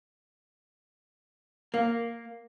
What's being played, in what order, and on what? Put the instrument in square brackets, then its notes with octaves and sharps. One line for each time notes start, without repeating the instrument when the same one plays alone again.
[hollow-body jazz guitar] A#3